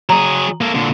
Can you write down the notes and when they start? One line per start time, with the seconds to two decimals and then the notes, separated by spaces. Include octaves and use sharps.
0.10 F#3 G#4 A#5
0.61 A#3 A4
0.75 A#2 D3